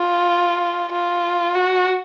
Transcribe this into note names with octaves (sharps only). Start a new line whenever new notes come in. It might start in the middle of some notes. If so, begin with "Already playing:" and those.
Already playing: F4
F4
F#4